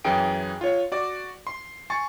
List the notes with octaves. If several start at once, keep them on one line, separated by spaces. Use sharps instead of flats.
F#2 E3 G#4 G5 G#5 D7
F4 C#5
F#4 D5 D6
C6
G#5 C6 C#6 A6